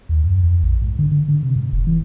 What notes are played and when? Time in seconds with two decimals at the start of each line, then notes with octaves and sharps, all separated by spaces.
0.09 D#2
0.24 F#2
0.43 F2
0.63 A#1
0.82 G#2
0.99 D3
1.12 D3
1.28 D3
1.43 C3
1.56 G#2
1.72 E1
1.87 E3